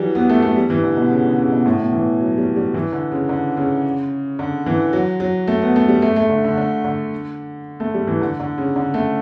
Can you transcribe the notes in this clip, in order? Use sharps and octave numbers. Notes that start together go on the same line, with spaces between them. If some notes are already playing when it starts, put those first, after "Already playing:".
Already playing: E3 F#3 G3
B3
A3
A3
G3
E3
D3
B2
C#3
D3
C#3
B2
A2
B2
E3
F#3
G3
G3
E3
D3
C#3
D3
C#3
D3
E3
F#3
F#3
A3
B3
A3
G3
A3
A3
D3
D3
D3
D3
A3
G3
E3
D3
D3
C#3
D3
A3